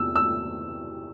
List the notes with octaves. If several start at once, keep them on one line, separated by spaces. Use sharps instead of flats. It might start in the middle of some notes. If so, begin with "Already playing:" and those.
Already playing: E2 C3 E6
E6